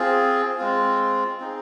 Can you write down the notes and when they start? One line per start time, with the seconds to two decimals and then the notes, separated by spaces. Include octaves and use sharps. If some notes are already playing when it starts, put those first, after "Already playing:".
Already playing: C4 F4 G#4
0.58 G#3 C4 F4
1.40 C4 D#4 G#4